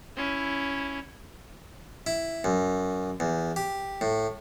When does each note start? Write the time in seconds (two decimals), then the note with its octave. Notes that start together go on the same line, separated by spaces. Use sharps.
0.17 C#4 E4
2.07 E4
2.44 F#2
3.20 E2
3.56 G4
4.01 A2